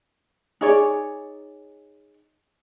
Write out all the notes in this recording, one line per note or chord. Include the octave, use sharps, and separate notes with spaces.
D#4 G#4 C#5 D5